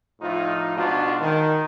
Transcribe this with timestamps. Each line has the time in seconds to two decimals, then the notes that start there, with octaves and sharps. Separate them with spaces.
0.22 A2 F3 D#4 F4
0.76 G#2 B2 D4 F4 F#4
1.20 D#3